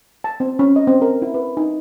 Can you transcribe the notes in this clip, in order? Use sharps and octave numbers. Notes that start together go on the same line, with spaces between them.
A5
C4
C#4
D#5
C4
A#4
E4
B4
D#4